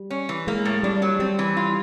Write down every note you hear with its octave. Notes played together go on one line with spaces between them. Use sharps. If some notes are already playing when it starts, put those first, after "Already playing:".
Already playing: G3
C#4
E3
G#3 A#3
A2
G3 D4
F#3
G3 C4
E3
F4